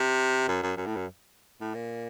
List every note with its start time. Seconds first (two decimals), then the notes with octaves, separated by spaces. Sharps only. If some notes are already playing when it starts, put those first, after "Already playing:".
Already playing: C3
0.48 F#2
0.63 F#2
0.77 F#2
0.86 A2
0.96 F#2
1.61 A2
1.75 A#2